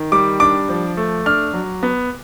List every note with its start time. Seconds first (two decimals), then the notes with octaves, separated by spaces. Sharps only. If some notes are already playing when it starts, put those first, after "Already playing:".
Already playing: D#3
0.12 G3 D6
0.40 D4 D6
0.69 F3
0.97 A3
1.26 D4 F6
1.54 F#3
1.83 B3